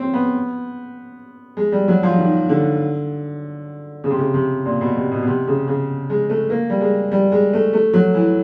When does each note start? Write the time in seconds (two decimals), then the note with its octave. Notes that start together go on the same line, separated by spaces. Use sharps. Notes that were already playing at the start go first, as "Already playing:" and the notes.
Already playing: C4 C#4
0.13 B3
1.57 G#3
1.72 G3
1.88 F#3
2.03 F3
2.18 D#3
2.49 D3
4.04 C#3
4.11 C3
4.19 C#3
4.34 C3
4.65 A#2
4.81 B2
4.96 C3
5.11 B2
5.22 B2
5.27 C3
5.47 C#3
5.68 C#3
6.10 G#3
6.30 A3
6.50 A#3
6.70 G3
6.81 G#3
7.12 G3
7.32 G#3
7.53 A3
7.73 A3
7.94 F#3
8.14 E3